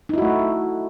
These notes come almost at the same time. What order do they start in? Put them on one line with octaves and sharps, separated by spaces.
D#4 E4 F#4 A3